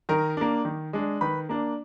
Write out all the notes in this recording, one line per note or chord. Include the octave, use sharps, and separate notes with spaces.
D#3 A#4 A#5
A#3 D4
D#3
G#3 D4
D#3 B4 B5
A#3 D4